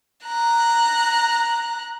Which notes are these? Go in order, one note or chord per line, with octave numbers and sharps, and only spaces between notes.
A#5 F#6